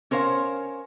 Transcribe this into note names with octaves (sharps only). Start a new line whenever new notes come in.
C#4 A#4 C5 C#5 F5